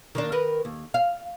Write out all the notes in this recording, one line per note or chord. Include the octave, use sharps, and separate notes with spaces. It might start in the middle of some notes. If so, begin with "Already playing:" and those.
D#3 A#3 D4
D#3 A#4 B4
D#2
F5